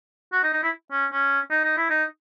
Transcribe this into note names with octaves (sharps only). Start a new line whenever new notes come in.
F#4
D#4
D#4
E4
C#4
C#4
D#4
D#4
E4
D#4